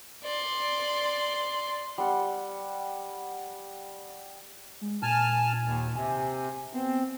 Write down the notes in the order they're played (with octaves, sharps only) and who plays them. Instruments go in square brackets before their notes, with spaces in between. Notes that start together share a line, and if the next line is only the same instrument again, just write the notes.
[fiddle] D5 C6
[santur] G3 F#5
[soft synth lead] G#3
[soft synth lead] A#2 [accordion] G#5 A5 F6
[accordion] D#2
[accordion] C3 [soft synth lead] G#5
[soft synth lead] B3 [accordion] C4